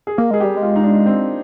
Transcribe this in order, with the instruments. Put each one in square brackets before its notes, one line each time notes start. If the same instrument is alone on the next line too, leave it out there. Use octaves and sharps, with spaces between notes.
[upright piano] G#4
[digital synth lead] A#3 [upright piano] A#4
[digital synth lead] G#3 [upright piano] G#4
[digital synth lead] G3 [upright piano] G4
[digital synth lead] G#3
[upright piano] F4
D#4
D4
C4